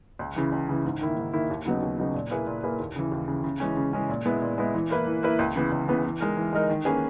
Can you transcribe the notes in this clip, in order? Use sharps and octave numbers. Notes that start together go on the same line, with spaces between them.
C#2
C#3 E3
C#2
C#3 E3
G#2
D#3 A#3 E4
G#2
D#3 A#3 E4
D#2
C#3 F#3 B3 D#4
D#2
C#3 F#3 B3 D#4
A#2
A#3 E4 G#4 B4
A#2
A#3 E4 G#4 B4
D#2
C#3 E3
D#2
C#3 E3
C#3
E3 G#3 C#4
C#3
E3 G#3 C#4
A#2
G#3 B3 E4
A#2
G#3 B3 E4
E3
A#3 E4 B4
E3
A#3 E4 B4
C#2
C#3 E3 B3
C#2
C#3 E3 B3
E3
G#3 D#4 A#4
E3
G#3 D#4 A#4
D#3
A#3 C#4 G#4 B4